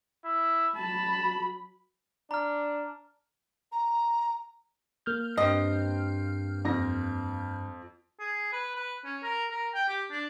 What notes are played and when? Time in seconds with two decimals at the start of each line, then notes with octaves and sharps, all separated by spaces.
0.25 E4
0.76 F#3 A5 B5
2.31 D4 A#5 F6
3.72 A#5
5.06 A#3 F6 G6
5.37 G2 C4 D#5
6.65 F2 A#6
8.20 G#4
8.53 B4
8.76 B4
9.05 C#4
9.23 A#4
9.51 A#4
9.74 G5
9.89 G4
10.11 D4